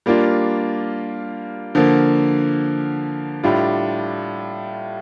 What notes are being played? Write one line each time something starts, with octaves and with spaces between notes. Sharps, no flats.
G3 A#3 D4 F4
D3 F3 A#3
A2 G3 D4 F4